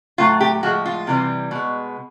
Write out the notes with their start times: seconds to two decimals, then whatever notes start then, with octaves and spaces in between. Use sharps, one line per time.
0.18 A2 F#3 A3 F4
0.40 G4
0.63 A2 F3 G#3 F#4
0.86 F4
1.07 C3 E3 G3
1.51 B2 G#3